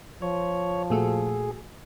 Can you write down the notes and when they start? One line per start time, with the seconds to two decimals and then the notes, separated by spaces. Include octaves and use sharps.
0.22 F3 C#5
0.90 A#2 A3 F#4 G#4